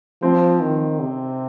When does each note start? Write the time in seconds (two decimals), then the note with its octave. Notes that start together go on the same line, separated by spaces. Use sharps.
0.22 F3 C4
0.61 D#3
1.01 C3